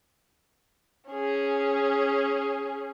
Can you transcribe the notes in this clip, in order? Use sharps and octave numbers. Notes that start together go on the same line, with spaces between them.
C#4 G#4